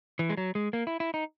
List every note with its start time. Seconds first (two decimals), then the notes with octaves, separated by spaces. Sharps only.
0.19 E3
0.30 G#3
0.37 F#3
0.55 G#3
0.73 A#3
0.87 E4
1.00 E4
1.14 D#4